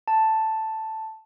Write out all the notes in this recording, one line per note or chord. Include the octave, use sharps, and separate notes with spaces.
A5